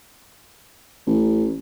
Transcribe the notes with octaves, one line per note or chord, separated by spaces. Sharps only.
A1